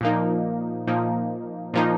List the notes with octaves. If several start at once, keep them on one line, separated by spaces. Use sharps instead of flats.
A#2 F3 A#3 D#4
A#2 F3 A#3 D#4
A#2 F3 A#3 D#4